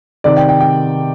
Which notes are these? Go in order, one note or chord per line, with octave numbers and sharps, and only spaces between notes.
C3 D#3 D5
G5
G5
G5